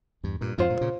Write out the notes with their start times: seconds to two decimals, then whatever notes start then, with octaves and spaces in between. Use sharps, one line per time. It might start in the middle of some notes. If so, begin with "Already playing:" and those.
0.23 E2 G2
0.41 G2 A#2
0.58 F2 G#2 F4 C5 F5
0.69 G2 A#2
0.81 A#2 C#3